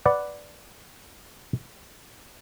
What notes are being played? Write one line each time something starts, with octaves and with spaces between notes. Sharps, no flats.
B4 D5 F#5